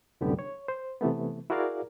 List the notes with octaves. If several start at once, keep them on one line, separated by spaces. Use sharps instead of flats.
C2 F#2 A2 D3 B3 G4
C#5
C5
C3 E3 A3 B3
E4 F#4 G#4 A#4 D5 F5